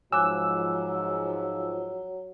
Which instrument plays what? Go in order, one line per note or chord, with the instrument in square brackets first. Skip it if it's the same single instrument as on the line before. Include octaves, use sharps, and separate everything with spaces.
[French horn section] G#2 F3 [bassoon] F#3 [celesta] G#5 D6 F#6 [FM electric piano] E6